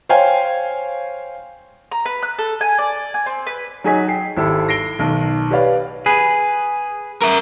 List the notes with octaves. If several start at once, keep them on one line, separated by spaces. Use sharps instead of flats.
C5 C#5 F5 G5 G#5
A#5
B4
F#6
A4
G#5
D5
G#5
C4
B4
F#3 D#4 G#4 C#5 G#5 B6
G5 C7
G#1 E4 G4 A4
A#6 C7 D7 G7
B1 D#3
G4 B4 C#5 D5 F5
G#4 B4
A#4 E5